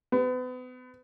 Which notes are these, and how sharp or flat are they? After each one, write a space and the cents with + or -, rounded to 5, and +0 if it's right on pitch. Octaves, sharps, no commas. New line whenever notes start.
B3 +35